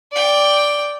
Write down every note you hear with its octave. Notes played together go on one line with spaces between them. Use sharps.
D5 G5